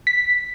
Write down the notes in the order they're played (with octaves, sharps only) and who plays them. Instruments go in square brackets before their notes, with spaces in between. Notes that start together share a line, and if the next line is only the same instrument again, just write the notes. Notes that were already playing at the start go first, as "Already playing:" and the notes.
[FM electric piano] B6